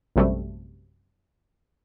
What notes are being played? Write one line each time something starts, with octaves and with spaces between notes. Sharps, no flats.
A#1 F#2 C3 G3 A3